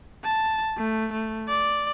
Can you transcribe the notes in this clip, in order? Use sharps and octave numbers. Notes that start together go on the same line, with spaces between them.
A5
A3
A3
D5